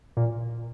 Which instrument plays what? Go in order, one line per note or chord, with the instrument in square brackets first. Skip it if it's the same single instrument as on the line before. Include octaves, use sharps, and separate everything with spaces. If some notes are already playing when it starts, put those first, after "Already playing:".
[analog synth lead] A#2